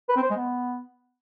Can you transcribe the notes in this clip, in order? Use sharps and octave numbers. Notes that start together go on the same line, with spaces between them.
B4
C4
C5
G#3
B3